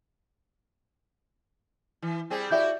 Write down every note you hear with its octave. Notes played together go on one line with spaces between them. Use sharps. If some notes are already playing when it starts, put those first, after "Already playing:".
E3
G3 C4 G#4
E4 F#4 G4 D5 E5 G6